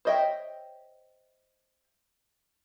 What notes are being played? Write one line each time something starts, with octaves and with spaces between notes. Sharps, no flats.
C5 C#5 D#5 E5 G5